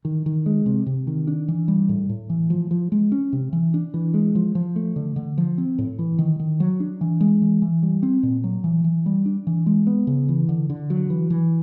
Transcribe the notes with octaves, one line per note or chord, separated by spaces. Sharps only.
D#3
D#3
G#3
C3
C3
D#3
D4
E3
G3
A2
A2
E3
F3
F3
G#3
C#4
C3
E3
D4
E3
G#3
F3
F3
A3
D3
D3
F3
C4
A2
E3
D#3
D#3
F#3
D4
E3
G#3
E3
E3
G3
C4
A#2
F#3
E3
E3
G3
D4
E3
G#3
B3
C#3
E3
D3
D3
F#3
E3
E3